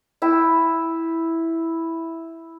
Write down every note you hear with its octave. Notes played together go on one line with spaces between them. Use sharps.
E4 E5 G5